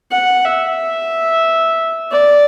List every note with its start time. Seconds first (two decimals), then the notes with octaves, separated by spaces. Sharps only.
0.11 F#5
0.44 E5
2.12 D5